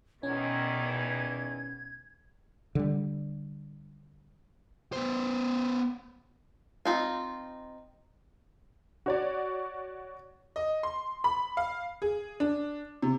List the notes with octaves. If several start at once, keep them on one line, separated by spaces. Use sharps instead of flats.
E2 B2 D#3 C#4 G#6
D3 G3
B3 C5
C4 D#4 F4
F#4 C#5 D5
D#5
C6
B5
F5
G#4
D4
C3